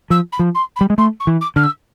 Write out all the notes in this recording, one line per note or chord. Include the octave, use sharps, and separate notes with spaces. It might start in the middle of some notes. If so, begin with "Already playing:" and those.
F3 E6
B5
F3
C6
B5
G3
G#3
A3 C6
C#6
E3
D6
D3 F6
E6